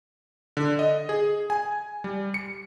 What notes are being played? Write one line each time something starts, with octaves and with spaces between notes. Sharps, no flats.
D3
D#5
G#4
G#5
G3
C#7